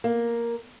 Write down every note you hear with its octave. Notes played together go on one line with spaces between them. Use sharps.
A#3